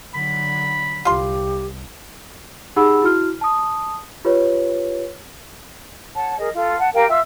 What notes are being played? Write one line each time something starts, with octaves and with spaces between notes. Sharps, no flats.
D3 F#3 B5
C2 F4 G4 C6
D#4 G4 G#4 F#5 B5 E6
E4 F#4 F6
A5 D#6
F4 G4 B4 C#5
C#5 F#5 A5
G#4 A#4 D#5
F4 A4
F#5 A5
G4 A#4 F5 G5
F4 E5 E6